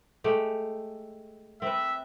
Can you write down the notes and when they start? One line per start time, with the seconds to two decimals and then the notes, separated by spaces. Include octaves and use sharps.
0.24 G#3 A3 G4
1.62 C4 B4 E5